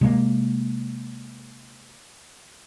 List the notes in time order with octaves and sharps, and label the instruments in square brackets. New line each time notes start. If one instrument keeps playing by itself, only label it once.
[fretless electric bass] C3 G#3 A#3